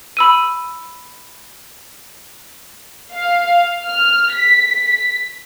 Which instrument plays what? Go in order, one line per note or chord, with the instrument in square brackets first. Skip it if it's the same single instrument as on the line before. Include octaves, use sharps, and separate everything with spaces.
[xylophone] B5 E6 D#7
[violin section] F5
F6
B6